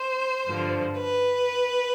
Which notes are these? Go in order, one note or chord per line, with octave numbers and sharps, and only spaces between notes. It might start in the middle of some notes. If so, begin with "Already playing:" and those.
Already playing: C5
G2 D3 F3
B4